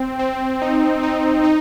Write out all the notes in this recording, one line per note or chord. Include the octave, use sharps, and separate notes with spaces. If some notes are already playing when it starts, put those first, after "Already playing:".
Already playing: C4
C4
D#4
D#4
D#4